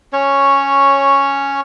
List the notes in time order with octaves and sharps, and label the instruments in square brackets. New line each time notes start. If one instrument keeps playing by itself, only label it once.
[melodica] C#4 C#5